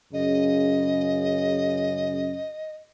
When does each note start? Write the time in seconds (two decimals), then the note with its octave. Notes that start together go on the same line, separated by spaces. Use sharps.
0.13 F#2 C#3 D#5